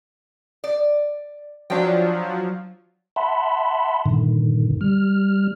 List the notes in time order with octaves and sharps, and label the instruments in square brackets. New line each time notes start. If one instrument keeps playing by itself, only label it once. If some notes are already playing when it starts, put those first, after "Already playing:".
[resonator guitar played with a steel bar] D5
[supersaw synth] F3 F#3 [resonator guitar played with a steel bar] D4 G5
[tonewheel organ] E5 F#5 A5 B5 C6
G2 A#2 D3 D#3
G3 F6